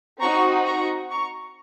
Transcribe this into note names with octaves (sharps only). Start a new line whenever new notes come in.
C4 D#4 F#4 A#5 C#6
A#5 C#6
A#5 C#6